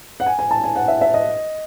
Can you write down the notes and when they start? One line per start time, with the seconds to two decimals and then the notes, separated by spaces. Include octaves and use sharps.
0.20 F#5
0.26 G#5
0.39 G#5
0.51 A5
0.64 G#5
0.76 F#5
0.88 E5
1.01 E5
1.14 D#5